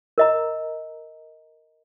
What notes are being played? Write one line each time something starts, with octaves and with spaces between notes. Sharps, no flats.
A#4 D#5 A#5